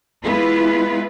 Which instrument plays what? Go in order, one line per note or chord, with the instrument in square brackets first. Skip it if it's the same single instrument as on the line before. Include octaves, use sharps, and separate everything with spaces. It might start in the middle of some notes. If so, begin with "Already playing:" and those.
[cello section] G#3 B3 E4 F4 B4